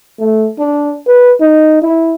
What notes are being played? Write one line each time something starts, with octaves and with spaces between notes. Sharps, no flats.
A3
D4
B4
D#4
E4